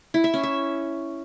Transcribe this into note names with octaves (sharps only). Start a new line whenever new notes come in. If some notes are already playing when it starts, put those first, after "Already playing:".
E4
E5
C#4
E5